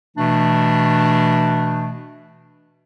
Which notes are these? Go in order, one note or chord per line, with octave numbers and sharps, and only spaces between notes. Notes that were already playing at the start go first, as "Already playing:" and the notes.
B2 E3 A3 D4